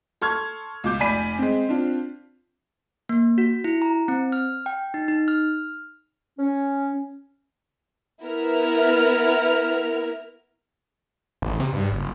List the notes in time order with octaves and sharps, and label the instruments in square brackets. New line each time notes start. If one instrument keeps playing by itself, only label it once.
[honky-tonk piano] A4 C6 C#6 F6 G#6
C#2 B2 D6 G6
F1 D5 G#5 B5 B6 D#7
G#3 C4
C4 D4 F4
[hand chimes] A#3
F#4
E4
A#5
C4
F6
G5
D#4
D#4
F6
[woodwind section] C#4
[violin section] B3 E4 A#4 F6
[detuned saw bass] A1
C3
G2
F#1